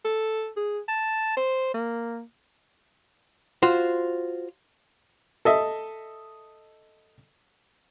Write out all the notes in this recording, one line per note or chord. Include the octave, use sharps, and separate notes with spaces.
A4
G#4
A5
C5
A#3
F4 F#4 C5
A4 D#5 E5